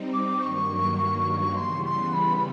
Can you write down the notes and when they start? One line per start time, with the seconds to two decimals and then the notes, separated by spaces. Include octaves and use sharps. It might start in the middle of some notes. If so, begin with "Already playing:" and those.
Already playing: G3 C4 D#4
0.13 D6
0.42 G2 D#3 F#3 A#3 C#6
1.56 C#3 E3 G3 B3 C6
1.86 C6
2.13 B5